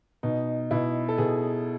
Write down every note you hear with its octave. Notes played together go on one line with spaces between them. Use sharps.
B2 D#4
B2 E4
A4
B2 G#4